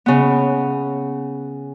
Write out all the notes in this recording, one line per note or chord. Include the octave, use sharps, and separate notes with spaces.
C#3 B3